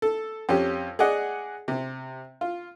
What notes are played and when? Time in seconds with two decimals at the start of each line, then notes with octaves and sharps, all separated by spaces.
0.02 A4
0.49 F2 C#4 G4
0.99 G#4 D5 D#5 F#5
1.68 C3
2.41 F4